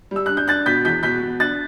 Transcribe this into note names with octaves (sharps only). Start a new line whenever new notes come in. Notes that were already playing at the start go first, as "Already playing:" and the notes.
G3 E6
D4 F#6
G6
D4 F#6 A6
B2 G6 B6
E2 G6 B6
B2 G6 B6
B2
D4 F#6 A6